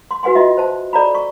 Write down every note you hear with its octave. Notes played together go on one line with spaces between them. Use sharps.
C6
F#4 B4 F#5 G#5 C6
F4 D#5 E5
C5 A5
A4 D5 A#5 B5
C#6